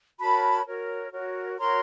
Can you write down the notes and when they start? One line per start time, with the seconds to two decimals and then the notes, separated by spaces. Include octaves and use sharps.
0.20 F#4 A#4 C#5 A5 B5
0.66 F#4 A#4 C#5
1.13 F#4 A#4 C#5
1.59 F#4 A#4 C#5 A#5 C6